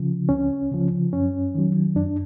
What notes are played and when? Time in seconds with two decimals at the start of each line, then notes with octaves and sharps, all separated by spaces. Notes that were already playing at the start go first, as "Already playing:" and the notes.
Already playing: C#3 F3
0.29 C#2 C#4
0.72 C#3 F3
1.13 F#2 C#4
1.55 D#3 F#3
1.95 F#2 D4